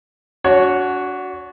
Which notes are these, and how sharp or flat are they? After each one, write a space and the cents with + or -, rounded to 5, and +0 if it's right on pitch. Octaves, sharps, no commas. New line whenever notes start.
D4 -35 F#4 +0 C#5 +0